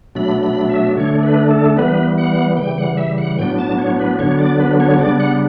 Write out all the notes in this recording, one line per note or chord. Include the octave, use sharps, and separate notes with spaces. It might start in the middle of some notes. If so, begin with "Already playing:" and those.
B2 F#3 A3 D4 B5
B5
E5
D3 A3 D4 C#5
B4
A4
E3 G3 B3 B4
F#5
C#3 E3 G3 G5
F#5
E5
F#5
A2 F#3 B3 D4 G5
A5
C#5
B4
D3 F#3 B3 D4 C#5
D5
B4
C#5
C#3 G3 B3 D4 D5
F#5